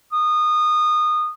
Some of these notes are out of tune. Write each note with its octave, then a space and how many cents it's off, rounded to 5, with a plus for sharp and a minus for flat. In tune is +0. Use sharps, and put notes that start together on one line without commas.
D#6 -20